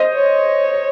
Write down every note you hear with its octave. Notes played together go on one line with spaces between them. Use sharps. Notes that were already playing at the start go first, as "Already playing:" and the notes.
Already playing: C5 D#5
C#5